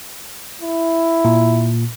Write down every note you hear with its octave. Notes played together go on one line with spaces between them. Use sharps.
E4
A#2